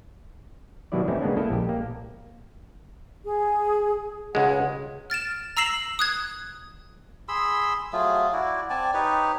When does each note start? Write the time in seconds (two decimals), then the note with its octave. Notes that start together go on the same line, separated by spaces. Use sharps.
0.92 B2 D#3 F#3 G3 E4 D5
1.08 E3 A3 C4 C#4 D#4 E4
1.22 C#3 G#3 A#3 B3 C#4 D4
1.37 A3 A#3 E4 A4 D#5
1.50 A#1 G4
1.69 A#3
3.26 G#4
4.35 C#2 G#3 C#5 F#5
5.10 F6 A6 D7 E7
5.57 A#5 E6 A#6 C7 E7 F#7
5.99 D#6 F#6 G#6
7.28 G#4 B5 C6 E6
7.93 F#3 A3 F4 G#4
8.33 E4 F#4 D5
8.70 C4 D5 G#5 A5
8.94 D#4 G4 B4 C#5